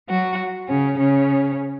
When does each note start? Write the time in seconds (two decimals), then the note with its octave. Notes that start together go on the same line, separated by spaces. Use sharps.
0.09 F#3 F#4
0.69 C#3 C#4
0.99 C#3 C#4